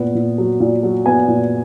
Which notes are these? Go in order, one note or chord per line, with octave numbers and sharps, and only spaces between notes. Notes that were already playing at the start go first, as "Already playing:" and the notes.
Already playing: A#2 B3
A#2
F#3
A#2
F#3
B3 G#5
A#2